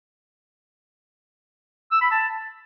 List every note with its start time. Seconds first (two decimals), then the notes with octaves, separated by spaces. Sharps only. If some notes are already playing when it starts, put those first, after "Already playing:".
1.92 E6
2.01 B5
2.11 A5